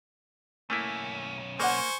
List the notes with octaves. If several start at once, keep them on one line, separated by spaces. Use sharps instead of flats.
B1 A3 A#3 C#4 E4
A#3 G#4 C5 D5 F#5 G#5 C#6